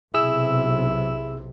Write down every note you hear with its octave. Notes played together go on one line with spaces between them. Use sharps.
B1 C3 E4 G#4 E6